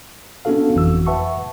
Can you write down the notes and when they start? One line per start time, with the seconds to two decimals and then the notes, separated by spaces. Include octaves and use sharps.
0.45 B3 C#4 D4 F#4 A4 F5
0.75 G1 F2 E3 F#4 E6
1.07 B4 E5 F#5 A5 C#6